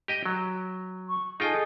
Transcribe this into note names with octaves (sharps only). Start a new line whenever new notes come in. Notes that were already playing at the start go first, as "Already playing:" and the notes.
G4 D#5 G5
F#3
C#6
D#4 F4 G#4 A4 D#5 G5